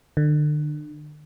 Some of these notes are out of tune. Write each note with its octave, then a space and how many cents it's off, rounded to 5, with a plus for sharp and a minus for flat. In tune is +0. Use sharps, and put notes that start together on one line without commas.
D3 +35